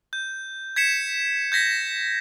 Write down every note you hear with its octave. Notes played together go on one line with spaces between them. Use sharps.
G6
G#6 B6 C#7 E7
G6 G#6 A#6 B6